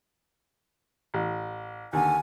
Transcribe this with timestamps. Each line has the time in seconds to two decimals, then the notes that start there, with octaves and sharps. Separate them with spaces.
1.14 A1
1.93 D#2 D3 G#5